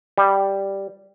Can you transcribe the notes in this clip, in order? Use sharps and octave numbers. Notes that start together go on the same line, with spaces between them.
G3